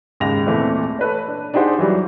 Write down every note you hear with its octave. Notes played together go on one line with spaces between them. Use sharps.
D#2 G#2 C#3 A#6 F7
A#2 E3 A3 C4
A4 B4 C#5
D4
D4 D#4 G4 G#4 C5 F#5
E3 F#3 G3